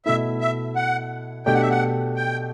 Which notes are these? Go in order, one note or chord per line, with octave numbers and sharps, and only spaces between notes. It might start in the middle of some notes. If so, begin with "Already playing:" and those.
B2 A3 E4 E5
E5
F#5
B2 A3 D4 G4 G5
F#5
E5
F#5
G5